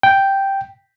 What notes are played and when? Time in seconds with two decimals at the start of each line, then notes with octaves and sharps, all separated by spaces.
0.03 G5